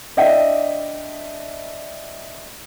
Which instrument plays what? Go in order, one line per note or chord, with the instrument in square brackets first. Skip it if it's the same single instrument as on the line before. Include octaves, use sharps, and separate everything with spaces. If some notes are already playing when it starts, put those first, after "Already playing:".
[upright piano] D4 D#5 E5 G5